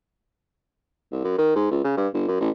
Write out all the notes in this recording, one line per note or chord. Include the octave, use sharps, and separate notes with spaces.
C2
F#2
D#3
G#2
C#2
C#3
G2
G1
F#2
A1